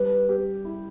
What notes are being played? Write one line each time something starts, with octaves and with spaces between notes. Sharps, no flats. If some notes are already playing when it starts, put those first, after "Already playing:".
Already playing: G3 B4
G4
E4